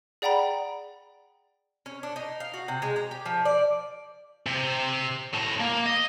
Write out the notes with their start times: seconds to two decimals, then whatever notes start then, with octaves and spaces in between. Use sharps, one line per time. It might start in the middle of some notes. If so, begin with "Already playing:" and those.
0.22 G#4 D5 F#5 G5 A#5 B5
1.86 C#4
2.03 D4
2.16 D#4
2.40 F5
2.54 F#4
2.68 C3
2.82 G#3
2.96 A#5
3.11 G4
3.26 F3
3.45 D5
4.47 C3
5.34 A2 A#5
5.60 A#3
5.86 D#5